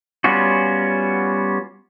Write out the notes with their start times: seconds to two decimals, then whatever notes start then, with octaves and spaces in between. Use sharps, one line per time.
0.24 G3 B3 C#4 F4 F#4